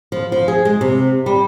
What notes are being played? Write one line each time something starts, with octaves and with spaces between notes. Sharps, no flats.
F3
F3
G#4
G#3
C3
G3